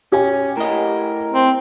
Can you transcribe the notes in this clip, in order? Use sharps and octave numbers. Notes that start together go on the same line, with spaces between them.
C#4 G4 G#5
A2 A#4 D#5
C4